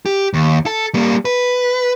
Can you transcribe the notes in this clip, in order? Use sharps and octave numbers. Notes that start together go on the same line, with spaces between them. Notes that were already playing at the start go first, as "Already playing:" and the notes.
G4
D#2
A4
G3 A#3
B4